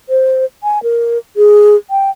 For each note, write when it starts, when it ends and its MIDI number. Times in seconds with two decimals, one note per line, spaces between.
0.09 0.45 72
0.63 0.82 80
0.83 1.18 70
1.37 1.76 68
1.90 2.10 79